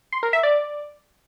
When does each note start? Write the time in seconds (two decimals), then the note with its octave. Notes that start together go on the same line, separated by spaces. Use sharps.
0.12 C6
0.23 A#4
0.33 E5
0.43 D5